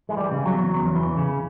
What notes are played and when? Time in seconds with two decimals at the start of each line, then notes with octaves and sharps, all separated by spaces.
0.09 E3 G#3
0.17 G3
0.31 C#3
0.46 F#3
0.53 E2
0.74 E2
0.95 E3
1.17 C#3